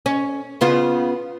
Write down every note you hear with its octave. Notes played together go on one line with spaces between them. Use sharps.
C#4
C#3 B3 F4